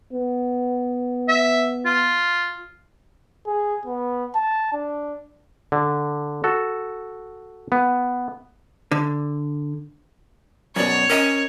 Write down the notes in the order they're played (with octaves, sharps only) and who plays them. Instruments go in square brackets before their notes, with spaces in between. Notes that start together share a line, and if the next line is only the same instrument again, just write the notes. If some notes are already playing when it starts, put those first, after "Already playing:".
[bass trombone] B3
[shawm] E5
F4
[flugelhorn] G#4
B3
A5
D4
[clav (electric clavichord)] D3
F#4 A4
B3
[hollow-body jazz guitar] D3
[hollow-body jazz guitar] F#2 B2 [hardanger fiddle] C#5 [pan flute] D5
[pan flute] C#4 [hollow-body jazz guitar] A#4 D#5